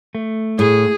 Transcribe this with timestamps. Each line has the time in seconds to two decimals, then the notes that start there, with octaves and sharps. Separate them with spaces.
0.15 A3
0.59 A2 G#4